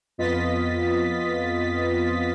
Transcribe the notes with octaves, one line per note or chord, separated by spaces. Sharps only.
F2 B3 F4 D#5 A6 B6